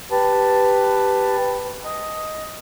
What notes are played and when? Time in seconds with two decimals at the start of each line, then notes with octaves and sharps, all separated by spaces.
0.11 G4 B4 A5
1.85 D#5